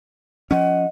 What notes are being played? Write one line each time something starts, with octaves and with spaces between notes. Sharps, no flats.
F3 C#4 D#5 F#5